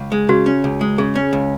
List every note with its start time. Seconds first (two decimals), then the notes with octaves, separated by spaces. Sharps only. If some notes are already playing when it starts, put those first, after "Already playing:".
Already playing: C#2
0.12 G#3
0.29 C#3 F#4
0.46 C#4
0.64 C#2
0.81 G#3
0.98 C#3 G#4
1.15 C#4
1.33 C#2